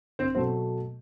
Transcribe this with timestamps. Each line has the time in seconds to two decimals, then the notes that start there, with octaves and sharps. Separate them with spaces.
0.19 C4 C5
0.35 B2 F#3 A3 C4 C5